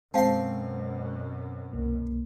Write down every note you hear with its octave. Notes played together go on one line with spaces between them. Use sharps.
F#2 B2 G#3 C4 F5 A5 C6
C2 A#3